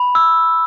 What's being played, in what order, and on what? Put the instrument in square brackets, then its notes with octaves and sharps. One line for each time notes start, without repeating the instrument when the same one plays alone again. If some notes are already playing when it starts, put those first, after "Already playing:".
Already playing: [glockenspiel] B5
E6